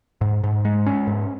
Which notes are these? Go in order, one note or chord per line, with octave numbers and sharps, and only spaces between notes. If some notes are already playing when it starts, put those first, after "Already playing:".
G#2
G#2
G#3
C#4
G#2